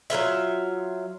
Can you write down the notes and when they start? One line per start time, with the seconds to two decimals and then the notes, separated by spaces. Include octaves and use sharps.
0.10 F#3 E4 F4 E5